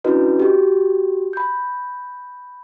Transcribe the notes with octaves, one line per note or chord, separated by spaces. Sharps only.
C#4 D4 E4 F#4 B4 D#5
F#4 G4
B5 G6